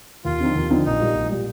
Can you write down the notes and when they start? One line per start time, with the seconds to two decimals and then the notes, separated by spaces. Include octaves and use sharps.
0.25 D#2 F4
0.40 D3 F3 C4 D#4
0.56 D#2
0.70 D3 F3 C4 D#4
0.85 A#1 D#4
1.00 A#2 G3
1.15 A#1
1.31 A#2 G3